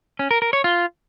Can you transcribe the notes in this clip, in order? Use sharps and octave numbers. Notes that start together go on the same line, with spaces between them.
C#4
A#4
A#4
C#5
F4